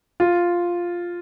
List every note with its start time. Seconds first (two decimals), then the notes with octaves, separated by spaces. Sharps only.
0.20 F4